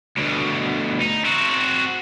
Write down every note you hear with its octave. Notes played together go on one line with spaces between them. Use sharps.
D2 B2
D#4
C4 F#4